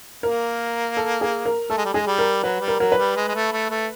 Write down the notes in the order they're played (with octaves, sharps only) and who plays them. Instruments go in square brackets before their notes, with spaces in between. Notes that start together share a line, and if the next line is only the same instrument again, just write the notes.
[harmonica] A#3 [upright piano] A#4
[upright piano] A4
G#4
A#4
[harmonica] A3 [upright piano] A4
[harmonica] G#3
G3
[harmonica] G#3 [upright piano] G#4
[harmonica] G3
[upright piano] A#4
[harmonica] F#3 [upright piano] B4
[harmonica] G3
[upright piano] A#4
[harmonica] F#3 [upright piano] A#4
[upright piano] B4
[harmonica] G3
G#3
G#3
A3
A3
A3